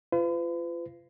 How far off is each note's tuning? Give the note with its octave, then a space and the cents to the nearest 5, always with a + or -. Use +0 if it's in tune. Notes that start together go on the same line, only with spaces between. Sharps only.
F4 -25 B4 +45